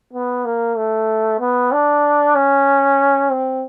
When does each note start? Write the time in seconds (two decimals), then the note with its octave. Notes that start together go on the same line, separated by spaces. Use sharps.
0.13 B3
0.45 A#3
0.77 A3
1.40 B3
1.72 D4
2.35 C#4
3.31 C4